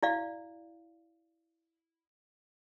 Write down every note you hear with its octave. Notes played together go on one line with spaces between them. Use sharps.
E4 D5 F5